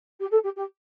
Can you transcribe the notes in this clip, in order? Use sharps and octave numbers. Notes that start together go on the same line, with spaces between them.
G4
A4
G4
G4